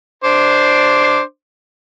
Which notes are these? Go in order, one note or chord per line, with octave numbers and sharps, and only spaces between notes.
D4 C5 D6